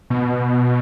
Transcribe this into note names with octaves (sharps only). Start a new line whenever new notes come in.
B2